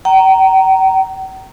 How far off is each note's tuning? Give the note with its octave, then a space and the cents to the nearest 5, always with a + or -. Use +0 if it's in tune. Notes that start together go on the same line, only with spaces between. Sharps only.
G5 -45 A#5 -5